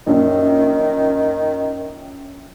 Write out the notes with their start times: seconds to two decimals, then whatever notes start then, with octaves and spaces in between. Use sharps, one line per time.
0.07 A#1 F#2 D#3